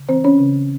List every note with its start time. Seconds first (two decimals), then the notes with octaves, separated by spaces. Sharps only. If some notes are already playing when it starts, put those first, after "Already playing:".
Already playing: C#3
0.09 E3 C4 C5
0.24 C#4 C#5
0.39 C#3